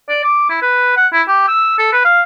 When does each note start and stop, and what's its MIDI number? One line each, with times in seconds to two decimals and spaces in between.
0.09 0.23 74
0.24 0.47 86
0.50 0.61 64
0.62 0.92 71
0.97 1.07 78
1.13 1.22 64
1.28 1.48 67
1.48 1.77 88
1.79 1.93 69
1.93 2.02 71
2.05 2.22 77